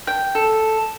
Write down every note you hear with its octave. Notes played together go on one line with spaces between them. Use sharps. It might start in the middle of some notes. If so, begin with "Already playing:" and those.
G5
A4